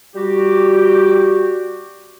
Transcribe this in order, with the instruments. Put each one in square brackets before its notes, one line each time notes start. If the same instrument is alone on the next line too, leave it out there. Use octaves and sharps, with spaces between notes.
[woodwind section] G3 F#4 G4